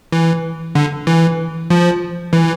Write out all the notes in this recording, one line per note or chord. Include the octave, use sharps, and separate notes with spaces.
E3
D3
E3
F3
E3